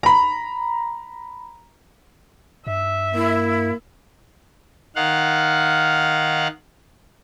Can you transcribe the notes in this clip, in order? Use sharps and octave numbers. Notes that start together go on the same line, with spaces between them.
A#5 B5
G2 E5
A#3 E4
D#3 F5 F#5